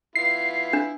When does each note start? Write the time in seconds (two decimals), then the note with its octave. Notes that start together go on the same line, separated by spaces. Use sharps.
0.16 B3 E4 F4 C7
0.73 D4